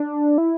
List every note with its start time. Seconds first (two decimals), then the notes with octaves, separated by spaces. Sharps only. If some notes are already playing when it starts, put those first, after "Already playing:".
Already playing: D4
0.38 E4